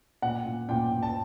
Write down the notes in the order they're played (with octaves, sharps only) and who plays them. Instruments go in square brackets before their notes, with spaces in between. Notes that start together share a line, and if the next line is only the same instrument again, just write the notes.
[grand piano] A#2 F#5
A#2
A#2 G5
A#2
A5